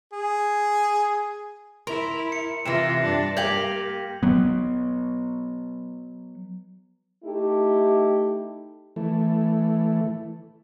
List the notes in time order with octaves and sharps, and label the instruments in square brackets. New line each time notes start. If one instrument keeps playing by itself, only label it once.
[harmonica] G#4
[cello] E4 [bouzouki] A#4 [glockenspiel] C6
[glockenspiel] C#7
[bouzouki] C3 E3 [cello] F4 [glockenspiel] A#6 E7
[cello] G2 D4
[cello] A#3 [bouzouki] G4 F5 [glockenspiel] G6 G#6 F#7
[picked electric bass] F#3 B3
[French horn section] A3 D#4 E4 G4
[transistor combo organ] E3 A3